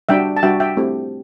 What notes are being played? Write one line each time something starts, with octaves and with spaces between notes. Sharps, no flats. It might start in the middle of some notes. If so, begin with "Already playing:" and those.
G3 D4 F#4 E5 G5
A5
G3 D4 F#4 E5 G5
E5 G5
A3 C4 E4 G4